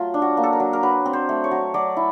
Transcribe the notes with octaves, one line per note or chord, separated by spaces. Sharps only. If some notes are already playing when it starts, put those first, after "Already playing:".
Already playing: F#3 A3 F4
D4
F#4
A#3
A4
A#4
F#3
A#4
F#3 B4
C4
C5
A3
C#5
F#3
F#3 D5
E4